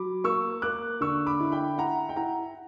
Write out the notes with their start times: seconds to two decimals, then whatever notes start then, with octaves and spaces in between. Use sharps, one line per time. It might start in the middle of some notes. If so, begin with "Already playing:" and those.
Already playing: F#3 B5 D6
0.24 A#3 C#6 E6
0.62 A#3 D6 F#6
1.01 D3 C#6 E6
1.27 B5 D6
1.40 E4
1.52 G5 B5
1.78 E4 F#5 A#5
2.09 G5
2.16 E4 F#5 A#5